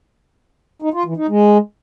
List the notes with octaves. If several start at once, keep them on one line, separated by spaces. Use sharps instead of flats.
D#4
F4
E3
D#4
G#3